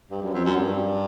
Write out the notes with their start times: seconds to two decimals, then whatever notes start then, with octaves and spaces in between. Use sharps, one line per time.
0.11 G2
0.22 F#2
0.34 F2
0.45 F#2
0.57 G2